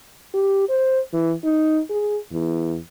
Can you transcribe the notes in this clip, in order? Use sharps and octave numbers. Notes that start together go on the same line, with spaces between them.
G4
C5
E3
D#4
G#4
E2